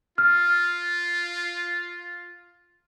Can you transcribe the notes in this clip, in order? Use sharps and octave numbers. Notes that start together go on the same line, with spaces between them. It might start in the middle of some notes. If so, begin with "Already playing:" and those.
F4 F6